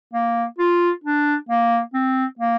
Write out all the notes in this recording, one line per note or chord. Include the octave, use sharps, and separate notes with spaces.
A#3
F4
D4
A#3
C4
A#3